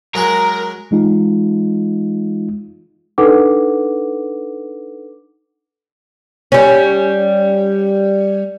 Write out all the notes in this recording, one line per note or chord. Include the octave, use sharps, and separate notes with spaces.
F#3 G#3 G#4 A#4 A#5
E3 G#3 D#4 F4
D4 D#4 A4 B4 F#5 D6
G3 C#4